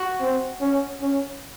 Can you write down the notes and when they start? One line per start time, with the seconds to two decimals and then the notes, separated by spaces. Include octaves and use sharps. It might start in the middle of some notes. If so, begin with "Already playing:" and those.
Already playing: F#4
0.21 C4
0.61 C#4
1.02 C#4